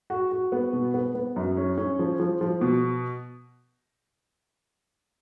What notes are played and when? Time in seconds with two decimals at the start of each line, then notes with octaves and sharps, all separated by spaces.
0.10 F#4
0.32 F#4
0.52 B3
0.73 B2
0.94 B3
1.15 B3
1.36 F#2
1.57 C#4
1.78 C#4
1.99 F3
2.20 F3
2.41 F3
2.61 B2